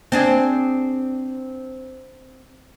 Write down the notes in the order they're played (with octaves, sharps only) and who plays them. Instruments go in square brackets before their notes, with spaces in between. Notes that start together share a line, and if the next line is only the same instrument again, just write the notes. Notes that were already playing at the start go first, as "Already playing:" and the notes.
[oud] C4 D4 G#4